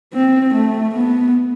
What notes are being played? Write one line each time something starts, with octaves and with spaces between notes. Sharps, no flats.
C4
A3
B3